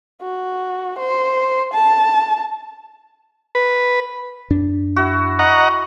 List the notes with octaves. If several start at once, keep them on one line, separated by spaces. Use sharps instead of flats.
F#4
C5
A5
B4
F#2 D4
E4 F#4
D#5 F#5 A#5